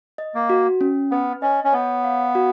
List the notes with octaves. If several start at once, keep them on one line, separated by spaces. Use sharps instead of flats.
D#5
A#3
F#4
C#4
B3 B4
C#4 D#5
C#4
B3 C#5
F5
F#4